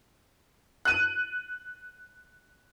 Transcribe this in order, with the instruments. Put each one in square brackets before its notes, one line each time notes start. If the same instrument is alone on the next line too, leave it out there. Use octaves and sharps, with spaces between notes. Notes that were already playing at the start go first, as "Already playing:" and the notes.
[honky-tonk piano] F#6 D#7